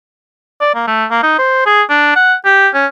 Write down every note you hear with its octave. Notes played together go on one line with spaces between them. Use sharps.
D5
A#3
A3
A#3
D#4
C5
G#4
D4
F#5
G4
C#4